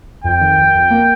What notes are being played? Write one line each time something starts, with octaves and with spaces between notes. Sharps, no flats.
F2 G5
D#3
F2
F2
A#3